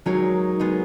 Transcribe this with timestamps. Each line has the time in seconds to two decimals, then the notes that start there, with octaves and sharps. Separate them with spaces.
0.05 F#3 G#3 D#4 A#4 C#5
0.59 G#3 B3 D#4